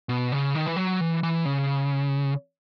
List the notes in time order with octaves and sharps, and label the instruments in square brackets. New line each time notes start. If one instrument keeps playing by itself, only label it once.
[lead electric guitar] B2
C#3
D#3
E3
F#3
E3
E3
C#3